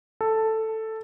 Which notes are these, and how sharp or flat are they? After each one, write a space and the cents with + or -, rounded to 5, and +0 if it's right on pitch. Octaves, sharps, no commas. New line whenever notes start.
A4 +5